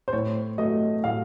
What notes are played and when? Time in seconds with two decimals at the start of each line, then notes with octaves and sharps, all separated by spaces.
0.08 C5
0.13 A2 C#5
0.58 F#3 A3 D#5
1.04 A2 F5